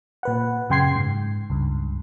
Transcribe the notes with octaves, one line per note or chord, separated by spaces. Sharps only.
A#2 B4 F#5
F#2 C#3 G5 C6 G#6 C7
G#2
C#2 G2